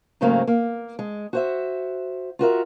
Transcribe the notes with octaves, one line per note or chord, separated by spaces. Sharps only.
G#2 C#3 F#3 A3 A#3 C4
A#3
G#3
F#4 C5 E5
F4 F#4 A#4 E5